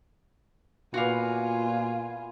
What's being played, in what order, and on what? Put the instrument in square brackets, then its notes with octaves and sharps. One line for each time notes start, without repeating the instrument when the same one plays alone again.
[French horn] A#2 [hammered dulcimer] E3 B3 D6 [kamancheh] F4 G#5 [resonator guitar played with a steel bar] F#4 F5